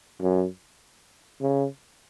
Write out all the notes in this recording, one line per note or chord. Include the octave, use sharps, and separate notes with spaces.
F#2
C#3